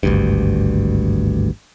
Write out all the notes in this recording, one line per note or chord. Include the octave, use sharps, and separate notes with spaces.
G#1 D2 G2